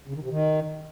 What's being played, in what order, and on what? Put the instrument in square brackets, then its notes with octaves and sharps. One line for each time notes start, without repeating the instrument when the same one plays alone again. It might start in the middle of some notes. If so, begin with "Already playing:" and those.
[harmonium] C#3
D#3
C3
D#3